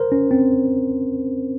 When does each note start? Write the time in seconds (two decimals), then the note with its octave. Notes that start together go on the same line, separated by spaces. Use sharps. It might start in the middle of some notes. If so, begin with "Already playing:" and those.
Already playing: A#4 C5
0.12 C#4
0.31 C4